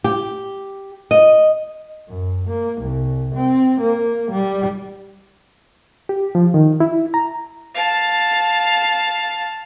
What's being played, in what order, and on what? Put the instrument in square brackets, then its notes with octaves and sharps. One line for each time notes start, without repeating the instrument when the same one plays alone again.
[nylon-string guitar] G4
D#5
[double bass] F#2
A#3
C2
C4
A#3
G3
[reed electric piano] G4
F3
D#3
E4
A#5
[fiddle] F5 A5